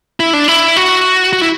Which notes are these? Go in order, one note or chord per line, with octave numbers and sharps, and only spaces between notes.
E4
D4
E4
F#4
F#4
E4